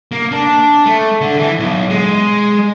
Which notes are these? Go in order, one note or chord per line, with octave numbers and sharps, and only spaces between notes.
A#3
D4
A3
D3
E3
B1
G#3